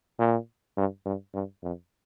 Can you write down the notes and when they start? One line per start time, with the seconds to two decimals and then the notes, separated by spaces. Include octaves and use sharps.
0.19 A#2
0.77 G2
1.06 G2
1.34 G2
1.63 F2